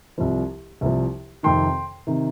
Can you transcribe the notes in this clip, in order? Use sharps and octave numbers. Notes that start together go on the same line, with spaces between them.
C2 C3 F3
C2 C3 F3
F2 C3 D#3 G5 C6
C3 D#3